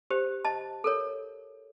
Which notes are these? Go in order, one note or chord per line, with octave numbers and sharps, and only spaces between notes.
G4 C5
D#5 A5
A4 A#4 C#5